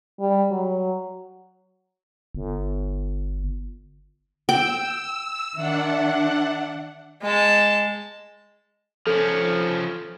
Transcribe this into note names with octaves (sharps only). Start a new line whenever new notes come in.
G3
F#3
G1
G5 E6
D#3 D4 E5 F#5
G#3 A5
F3 C#4 A4